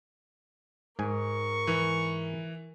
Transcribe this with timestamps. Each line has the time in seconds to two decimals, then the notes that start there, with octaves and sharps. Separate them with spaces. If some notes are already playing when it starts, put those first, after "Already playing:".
0.99 G#2 A#4 G#5 C#6
1.67 E3